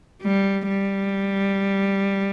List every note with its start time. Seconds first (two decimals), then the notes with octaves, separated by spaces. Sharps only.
0.22 G3
0.69 G3